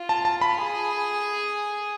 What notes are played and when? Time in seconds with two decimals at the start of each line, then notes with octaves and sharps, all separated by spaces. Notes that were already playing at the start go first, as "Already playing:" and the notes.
Already playing: F4
0.09 A5
0.25 A5
0.41 B5
0.57 G#4